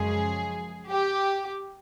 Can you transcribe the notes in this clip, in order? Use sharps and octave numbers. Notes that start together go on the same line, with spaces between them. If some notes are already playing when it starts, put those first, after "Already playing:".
Already playing: F#2 C#3 F3 G#3 G#4
G4